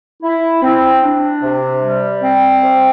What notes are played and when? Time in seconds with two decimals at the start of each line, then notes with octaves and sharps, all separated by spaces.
0.23 E4
0.62 C4
1.03 D4
1.42 C3
1.82 G3
2.21 C4
2.62 C3